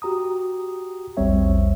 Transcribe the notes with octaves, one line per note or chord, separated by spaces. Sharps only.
F#4 G4 A#5 D#6
A#1 E2 G3 C4 C#5 E5